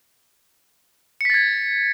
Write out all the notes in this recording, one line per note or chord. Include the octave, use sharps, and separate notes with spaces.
G#6 A6 B6 C#7